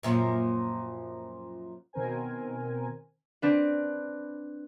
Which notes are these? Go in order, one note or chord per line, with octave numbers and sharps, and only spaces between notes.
F#2 A#2 F3
B2 D#3 C4 A#4 C5 G#5
C4 D4 B4